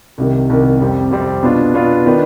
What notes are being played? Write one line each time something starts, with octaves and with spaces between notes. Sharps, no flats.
C2 C3 D#3
C2 C3 D#3
F2 C3 G3 C4
F2 C3 G3 C4
B2 B3 D4 F4
B2 B3 D4 F4
D#3 B3 D4